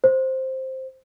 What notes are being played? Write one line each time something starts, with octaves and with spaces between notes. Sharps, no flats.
C5